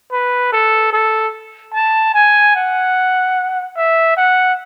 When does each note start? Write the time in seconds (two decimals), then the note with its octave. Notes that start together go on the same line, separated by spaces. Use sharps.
0.12 B4
0.52 A4
0.93 A4
1.74 A5
2.14 G#5
2.56 F#5
3.77 E5
4.17 F#5